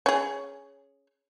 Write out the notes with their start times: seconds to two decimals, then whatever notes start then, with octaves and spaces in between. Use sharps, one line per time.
0.06 C#4 G#4